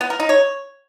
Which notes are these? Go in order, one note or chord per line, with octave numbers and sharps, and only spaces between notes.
B3
A#4
D#4
C#5